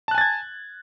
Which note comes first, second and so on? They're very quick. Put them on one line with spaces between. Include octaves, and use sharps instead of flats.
A5 F#6 G#5 A6 G#6